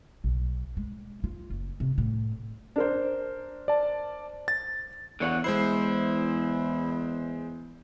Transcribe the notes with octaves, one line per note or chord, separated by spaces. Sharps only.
B1
G#3
F4
F#1
C3
A2
D4 A#4 C5
D5 A5
A6
E2 D3 C#5 F#5
E2 G#3 E4 C5 C7